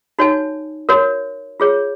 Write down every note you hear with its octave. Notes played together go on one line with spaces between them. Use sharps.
D#4 F#4 C#5 G#5
F#4 A#4 C#5
F4 G#4 C#5